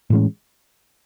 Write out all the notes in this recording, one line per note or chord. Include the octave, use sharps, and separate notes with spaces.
A2 E3 G#3 C#4